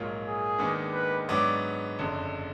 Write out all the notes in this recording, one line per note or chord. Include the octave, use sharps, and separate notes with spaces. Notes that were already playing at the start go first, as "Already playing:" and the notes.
Already playing: A#1 G#2 F#3 A#3 F4
G#4
D#2 D#3 G#3 B3 D4
B4
G#2 F#3 B3 D4 D5
F#1 F2 D3